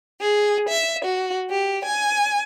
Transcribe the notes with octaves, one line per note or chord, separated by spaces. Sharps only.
G#4
E5
F#4
G4
G#5